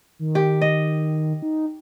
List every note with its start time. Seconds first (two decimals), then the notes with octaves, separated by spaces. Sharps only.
0.19 D#3
0.35 G4
0.61 D#5
1.42 D#4